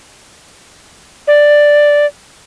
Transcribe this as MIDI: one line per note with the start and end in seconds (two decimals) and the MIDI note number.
1.27 2.06 74